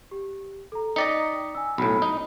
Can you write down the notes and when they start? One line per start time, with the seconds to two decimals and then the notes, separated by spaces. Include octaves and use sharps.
0.11 G4
0.72 A4 A#5
0.96 D#4 D5 D#5 G5 B6 C#7
1.55 G#5 E6
1.78 B1 A2 B5
2.02 D#4